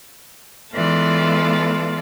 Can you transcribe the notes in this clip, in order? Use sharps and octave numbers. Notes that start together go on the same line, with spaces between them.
E3 G#3 B3 F4 A4 D5